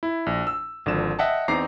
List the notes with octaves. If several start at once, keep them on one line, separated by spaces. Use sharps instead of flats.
E4
A#1
E6
G#1 D3 F3 E7
D#5 E5 F#5 G5 A5
E2 C4 D#4 A#5 D6 C7